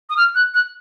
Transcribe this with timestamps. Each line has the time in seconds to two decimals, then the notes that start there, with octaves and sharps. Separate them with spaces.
0.10 D#6
0.17 F6
0.35 F#6
0.54 F#6